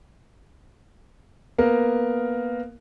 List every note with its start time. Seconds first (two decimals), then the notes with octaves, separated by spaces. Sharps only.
1.58 A#3 B3 A#4